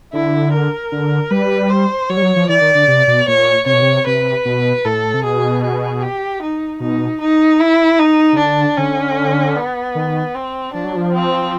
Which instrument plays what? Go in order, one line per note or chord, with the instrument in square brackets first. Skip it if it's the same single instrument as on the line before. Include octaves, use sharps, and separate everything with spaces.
[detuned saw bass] D3 [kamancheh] E4
[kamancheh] A#4
[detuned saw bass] D3
[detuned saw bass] G3 [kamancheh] B4
[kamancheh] C5
[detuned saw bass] F#3 [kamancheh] C#5
[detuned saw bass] G3
F#3
F3
[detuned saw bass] E3 [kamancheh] D5
[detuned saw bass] D#3
D3
C3
B2
[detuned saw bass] A#2 [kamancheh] C#5
[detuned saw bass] C3 [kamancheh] C#5
[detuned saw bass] B2
C3
[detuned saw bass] C3 [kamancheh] B4
[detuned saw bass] B2
[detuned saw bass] A2 [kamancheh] A4
[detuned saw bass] C3
[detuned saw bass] B2 [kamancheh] G#4
[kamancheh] G#4
G4
D#4
[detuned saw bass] B2 [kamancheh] D#4
[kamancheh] D#4
E4
D#4
[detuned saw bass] C#3
[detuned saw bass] D3 [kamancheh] D4
[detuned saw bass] D3 [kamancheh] C#4
[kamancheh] B3
[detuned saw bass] D#3
[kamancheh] C4
[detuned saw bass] F3 [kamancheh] D4
[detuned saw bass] F#3
F3
[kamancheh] C4